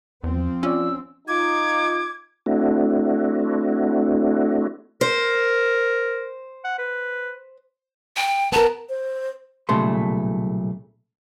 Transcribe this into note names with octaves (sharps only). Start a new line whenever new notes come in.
E2 F3 C4
C#4 F4 D5 E6
D#4 F4 D6 G#6
A3 C4 D4 E4 F#4
A#4 C5
F#5
B4
G5
B3 A#4 A5
C5
B1 A#2 C#3 G3 A3 C6